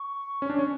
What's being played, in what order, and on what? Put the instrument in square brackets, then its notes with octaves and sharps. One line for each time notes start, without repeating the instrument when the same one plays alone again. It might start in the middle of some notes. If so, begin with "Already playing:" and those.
Already playing: [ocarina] C#6
[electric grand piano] C#4
D4
C#4